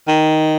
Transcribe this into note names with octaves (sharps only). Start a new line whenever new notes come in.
D#3